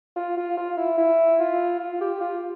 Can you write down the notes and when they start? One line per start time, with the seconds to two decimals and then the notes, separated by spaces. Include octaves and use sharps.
0.16 F4
0.37 F4
0.57 F4
0.77 E4
0.98 E4
1.40 F4
1.80 F4
2.01 G4
2.21 F4